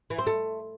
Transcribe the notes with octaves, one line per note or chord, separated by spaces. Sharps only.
E3
C4
A3